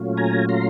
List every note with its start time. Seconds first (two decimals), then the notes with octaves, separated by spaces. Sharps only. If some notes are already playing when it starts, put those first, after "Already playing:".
Already playing: A#2 F#3 A3 C#4 F4
0.17 G#5 A#5
0.49 A#5 C6